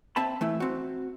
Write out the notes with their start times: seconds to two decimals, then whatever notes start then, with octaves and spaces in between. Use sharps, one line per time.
0.16 C4 E5 A5 B5
0.41 E3 A3 E4
0.60 C4 F#4